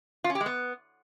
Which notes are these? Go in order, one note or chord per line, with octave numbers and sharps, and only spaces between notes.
F4
C#4
G4
G#3
B3